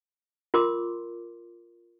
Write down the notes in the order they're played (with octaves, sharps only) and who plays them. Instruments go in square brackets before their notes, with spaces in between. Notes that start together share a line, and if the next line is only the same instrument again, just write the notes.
[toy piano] F4 A#4 C6 D6